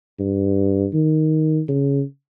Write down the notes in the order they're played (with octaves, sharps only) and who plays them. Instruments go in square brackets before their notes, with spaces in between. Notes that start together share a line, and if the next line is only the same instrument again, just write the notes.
[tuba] G2
D#3
C#3